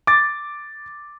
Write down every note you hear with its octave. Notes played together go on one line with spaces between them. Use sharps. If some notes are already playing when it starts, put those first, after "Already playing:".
D6 A6